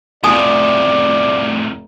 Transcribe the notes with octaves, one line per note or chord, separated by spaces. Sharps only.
F1 A2 C3 F4 D5 G#5 A5 D#6